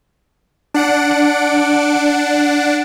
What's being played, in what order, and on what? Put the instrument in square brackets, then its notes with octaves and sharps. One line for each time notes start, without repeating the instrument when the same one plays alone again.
[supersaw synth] D4 F#5 D7